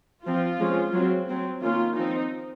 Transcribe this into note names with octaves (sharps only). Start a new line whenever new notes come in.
F3 C4 F4
F3 G#3 C#4
F#3 C4
F#3 C4
D#3 A#3 C#4 F4
F3 C4 D#4